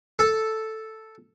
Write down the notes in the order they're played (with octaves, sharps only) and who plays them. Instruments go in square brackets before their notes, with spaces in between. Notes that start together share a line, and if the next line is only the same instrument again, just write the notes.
[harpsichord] A4